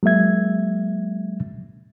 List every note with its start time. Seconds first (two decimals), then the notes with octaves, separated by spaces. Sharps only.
0.03 F#3 G#3 A#3 E5 G#6